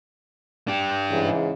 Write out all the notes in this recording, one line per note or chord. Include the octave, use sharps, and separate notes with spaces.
D4 G4
G#2 C#3 E3